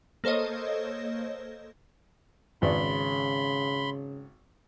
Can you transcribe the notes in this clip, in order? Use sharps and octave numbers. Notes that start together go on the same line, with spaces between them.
A#3 A4 C5 C#5 D#5
G#1 C#3 B4 D5 B5 C6